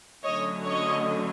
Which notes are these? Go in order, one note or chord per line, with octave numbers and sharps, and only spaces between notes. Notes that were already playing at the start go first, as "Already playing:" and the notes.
D3 F#3 A3 C#4 C#5 D#5
C#5 D#5